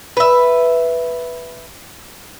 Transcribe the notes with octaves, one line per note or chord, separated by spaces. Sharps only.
B4 E5